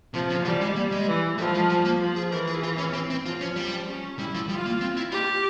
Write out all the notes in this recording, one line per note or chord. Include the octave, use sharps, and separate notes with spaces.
C3 F3
C#3
E3 G3
G#3
A#3
G#3
E3
F3 G3
G#3
G3
A#3
F3
G#4
E3 A#4
G#4
F4
C#4
C4
C4
F3 F4
C#4
F3 G3
C#4
G3 E4
F3
G3 F4
A#3
C4
E4
F4 G4